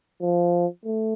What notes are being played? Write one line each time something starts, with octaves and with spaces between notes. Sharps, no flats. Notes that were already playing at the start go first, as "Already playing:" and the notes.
F3
A3